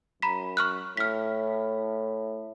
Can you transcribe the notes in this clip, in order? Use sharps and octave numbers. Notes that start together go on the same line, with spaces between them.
F#2 A#5 B5 B6
C#6 F6 F#6
A2 F6 B6